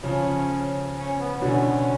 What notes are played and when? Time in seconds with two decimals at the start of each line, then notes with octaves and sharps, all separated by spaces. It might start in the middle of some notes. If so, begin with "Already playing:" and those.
0.03 C#3 F3 C#4
0.96 C#4
1.19 B3
1.41 B2 D3 C#4